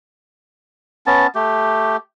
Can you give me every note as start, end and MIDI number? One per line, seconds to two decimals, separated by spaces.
1.07 1.27 59
1.07 1.27 61
1.07 1.27 81
1.35 1.97 57
1.35 1.97 67